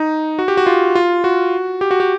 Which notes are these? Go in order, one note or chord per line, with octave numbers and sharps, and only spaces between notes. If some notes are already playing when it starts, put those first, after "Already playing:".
Already playing: D#4
F#4
G4
F#4
F4
F4
F#4
G4
F#4
G4